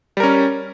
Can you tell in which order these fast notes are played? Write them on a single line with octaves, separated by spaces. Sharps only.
G3 A#4 C#4